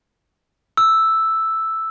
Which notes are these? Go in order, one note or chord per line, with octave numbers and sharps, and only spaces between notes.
E6